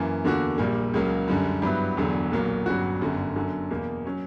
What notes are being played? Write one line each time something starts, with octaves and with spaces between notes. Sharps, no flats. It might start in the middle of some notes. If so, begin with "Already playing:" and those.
Already playing: F#2 E3 A#3
E2 D3 A#3 D4 F#4
A#1 A#2 G3 A#3
C#2 C#3 F#3 A#3
F#2 D3 G3
G2 F#3 B3 E4
E1 E2 D3 F#3
B1 A#2 F#3 A#3
G1 G2 F#3 C#4 F#4
G1 F#2 D3
F#2 D3 F#3
E2 B2 A#3
F#3 C#4